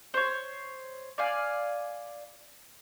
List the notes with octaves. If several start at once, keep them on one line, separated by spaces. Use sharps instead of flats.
C5 C#5
D5 F5 G#5